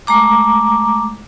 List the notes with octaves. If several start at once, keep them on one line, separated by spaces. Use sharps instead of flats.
G#3 A3 A#5 D6